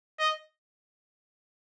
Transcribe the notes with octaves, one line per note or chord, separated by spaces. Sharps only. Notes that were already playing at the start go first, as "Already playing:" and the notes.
D#5